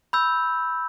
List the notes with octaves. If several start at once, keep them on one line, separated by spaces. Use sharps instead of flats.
B5 E6 G6